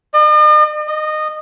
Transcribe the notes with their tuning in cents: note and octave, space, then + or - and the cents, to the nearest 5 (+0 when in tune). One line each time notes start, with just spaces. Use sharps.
D#5 -45
D#5 -20